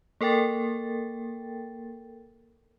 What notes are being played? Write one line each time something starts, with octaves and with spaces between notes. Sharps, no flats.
A#3 A4 A#4 G5 A6